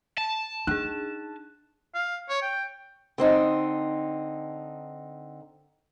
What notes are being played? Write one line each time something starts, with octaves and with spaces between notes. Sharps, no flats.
A5
D4 D#4 G#4 F#6
F5
C#5
G5
D3 C4 D#4